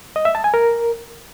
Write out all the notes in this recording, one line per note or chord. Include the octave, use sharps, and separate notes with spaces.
D#5
E5
A5
G#5
A#4